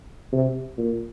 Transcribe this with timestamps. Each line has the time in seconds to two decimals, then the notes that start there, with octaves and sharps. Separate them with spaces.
0.33 C3
0.77 A#2